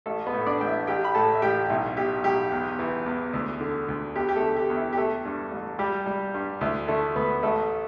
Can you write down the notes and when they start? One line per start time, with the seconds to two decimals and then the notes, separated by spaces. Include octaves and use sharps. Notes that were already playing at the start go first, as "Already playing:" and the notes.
0.06 A1 A3 A4
0.26 B3 B4
0.33 A2
0.47 D4 D5
0.61 A1 G5
0.67 E4 E5
0.87 A1 G4 G5
1.05 B5
1.15 A2 A4 A5
1.34 E5
1.42 A1 G4 G5
1.70 B1 E4
1.97 B2 G4
2.24 B1 G4
2.52 E2
2.79 E3
3.06 E2
3.33 D2
3.61 D3
3.88 D2
4.15 E2 G4
4.29 G4
4.36 A3 A4
4.43 D3
4.57 G4
4.70 E2
4.77 E4
4.93 G4
4.97 A3 A4
5.25 G2
5.52 A1
5.79 G3 G4
6.06 G3
6.34 G2
6.61 D2 E4
6.88 D3 A3 A4
7.16 D2 B3 B4
7.43 A1 A3 A4